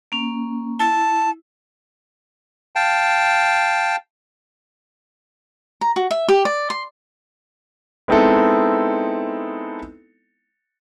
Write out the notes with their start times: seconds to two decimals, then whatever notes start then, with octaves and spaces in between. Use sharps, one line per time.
0.12 A#3 C#4
0.79 E4 A5
2.76 F5 G5 A5
5.81 A#5
5.96 F#4
6.11 E5
6.28 G4
6.45 D5
6.70 C6
8.08 G#3 B3 C4 D#4 E4 A4